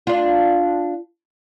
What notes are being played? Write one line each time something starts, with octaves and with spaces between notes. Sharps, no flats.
D4 F4